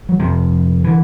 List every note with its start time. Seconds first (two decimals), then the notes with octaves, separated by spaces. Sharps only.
0.09 F#3
0.19 F2 C3 F3
0.84 D3 E3